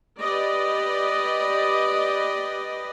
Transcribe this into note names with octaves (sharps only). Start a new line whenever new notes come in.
G4 B4 D5 D#5